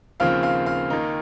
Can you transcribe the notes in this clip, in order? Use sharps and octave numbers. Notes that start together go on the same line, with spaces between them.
D#2 C#3 F3 C4 F4 F5 F6
F5 F6
F5 F6
D#2 D#3 A#3 D#4